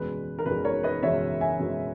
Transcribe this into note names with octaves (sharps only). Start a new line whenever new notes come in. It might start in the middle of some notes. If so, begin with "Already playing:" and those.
Already playing: F#1 E2 B2 G#3 B4
A#4
F#1 E2 B2 G#3 B4
A#4 C#5
B4 D#5
F#1 E2 B2 G#3 C#5 E5
E5 G#5
F#1 E2 B2 G#3